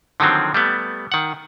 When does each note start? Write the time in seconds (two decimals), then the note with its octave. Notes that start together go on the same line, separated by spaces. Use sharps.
0.20 D3 D#3 F3 F#3 C4
0.54 G3 A3 B3
1.12 D#3 F#5